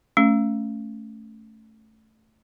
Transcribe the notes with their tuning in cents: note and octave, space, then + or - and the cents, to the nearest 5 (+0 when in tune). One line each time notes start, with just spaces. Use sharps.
A3 +0 C#4 +0